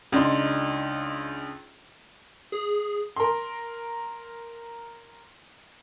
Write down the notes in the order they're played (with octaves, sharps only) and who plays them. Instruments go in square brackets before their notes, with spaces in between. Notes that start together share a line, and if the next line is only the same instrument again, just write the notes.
[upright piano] C#2 D4 D#4 C6
[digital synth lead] G#4
[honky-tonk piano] A#4 C6